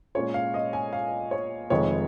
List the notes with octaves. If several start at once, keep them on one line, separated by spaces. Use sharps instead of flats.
A#2 G#3 C#4 F4 C#5
F5
D#5
G#5
F5
C#5
F1 F2 D#3 G#3 C#5